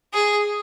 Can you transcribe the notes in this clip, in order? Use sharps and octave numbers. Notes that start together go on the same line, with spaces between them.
G#4